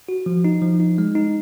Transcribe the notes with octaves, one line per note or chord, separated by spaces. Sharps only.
F#4
F3
D#4
F3
D#4
G#3
D#4